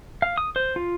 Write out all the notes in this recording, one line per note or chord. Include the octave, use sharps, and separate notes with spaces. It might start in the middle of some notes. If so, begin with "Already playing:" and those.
F5
D#6
C5
F4